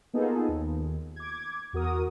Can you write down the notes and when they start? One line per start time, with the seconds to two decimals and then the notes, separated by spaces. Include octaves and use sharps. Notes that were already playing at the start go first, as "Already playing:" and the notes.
0.14 A#3 B3 D#4 F4 G#4 A4
0.48 D#2
1.16 D6 G#6
1.73 E2 F#4 A#4 D#6